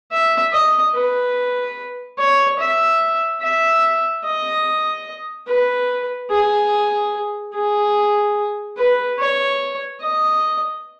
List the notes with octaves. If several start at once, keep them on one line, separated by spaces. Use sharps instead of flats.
E5
D#5
B4
C#5
E5
E5
D#5
B4
G#4
G#4
B4
C#5
D#5